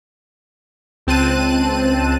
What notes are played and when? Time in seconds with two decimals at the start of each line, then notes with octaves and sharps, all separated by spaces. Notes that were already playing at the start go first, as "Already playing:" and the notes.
1.07 C#2 C4 A5 F#6 D#7